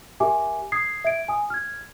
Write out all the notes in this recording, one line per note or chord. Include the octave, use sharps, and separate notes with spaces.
G4 A#4 E5 G#5 D6
D#6 G#6 C7
E5 G#6 D7
G#5 D#6
F6 G#6